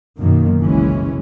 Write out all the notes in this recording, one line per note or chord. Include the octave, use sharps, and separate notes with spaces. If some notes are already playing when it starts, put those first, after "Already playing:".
F#2 B2 D#3 A#3
F#1 C2 E3 G#3 C#4